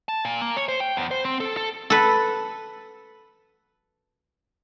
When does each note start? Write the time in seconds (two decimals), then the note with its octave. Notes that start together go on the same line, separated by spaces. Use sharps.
0.09 A5
0.25 A#2
0.41 A#3
0.56 C#5
0.68 C5
0.80 G5
0.97 E2
1.11 C5
1.25 C4
1.40 A4
1.57 A4
1.90 A4 B4